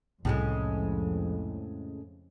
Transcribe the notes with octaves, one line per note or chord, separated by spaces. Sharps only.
C2 F2 A2 C#3 G#3